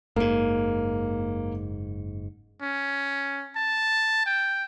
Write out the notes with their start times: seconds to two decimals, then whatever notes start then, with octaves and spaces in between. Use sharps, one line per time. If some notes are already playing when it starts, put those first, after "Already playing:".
0.16 F#1 G#2 A#3
2.61 C#4
3.56 A5
4.26 G5